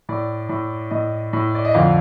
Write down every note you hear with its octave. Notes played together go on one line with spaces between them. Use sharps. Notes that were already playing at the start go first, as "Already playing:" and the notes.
A2 D5
A2
A2 D#5
A2
D5
D#5
F2 D3 F5